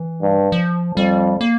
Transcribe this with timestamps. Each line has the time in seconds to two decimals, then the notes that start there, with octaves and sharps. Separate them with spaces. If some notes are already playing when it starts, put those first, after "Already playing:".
Already playing: E3
0.22 G2
0.52 F3
0.96 F2 G3
1.41 A#3